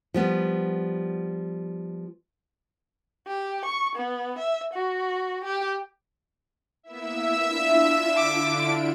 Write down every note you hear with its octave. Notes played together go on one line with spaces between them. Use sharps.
F3 G3 B3
G4
C#6
B3
E5
F#4
G4
A#3 B3 E4 E5 E6
D4 E4 F4
D3 D6 D7